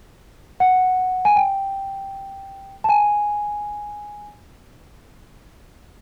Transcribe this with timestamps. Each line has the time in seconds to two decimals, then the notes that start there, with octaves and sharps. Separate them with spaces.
0.60 F#5
1.25 G#5
1.36 G5
2.84 A5
2.89 G#5